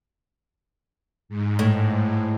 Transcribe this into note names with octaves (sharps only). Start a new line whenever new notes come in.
G#2
A2